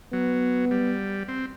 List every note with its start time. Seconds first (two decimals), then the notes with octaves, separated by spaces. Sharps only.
0.12 F#3 B3
0.71 G3
1.28 C4